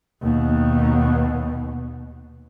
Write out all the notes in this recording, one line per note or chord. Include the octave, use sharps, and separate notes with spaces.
D#2 B2